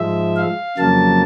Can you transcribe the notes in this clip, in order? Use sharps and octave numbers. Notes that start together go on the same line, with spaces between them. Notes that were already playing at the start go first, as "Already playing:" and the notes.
Already playing: G#2 F3 G#3 E5
F5
F2 C#3 F#3 A#3 A5